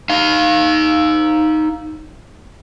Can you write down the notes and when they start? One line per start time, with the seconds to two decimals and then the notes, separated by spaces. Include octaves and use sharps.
0.10 D#4 F5